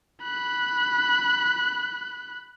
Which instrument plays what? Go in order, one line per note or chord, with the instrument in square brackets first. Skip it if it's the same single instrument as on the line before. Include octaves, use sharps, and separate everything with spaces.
[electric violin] B5 F#6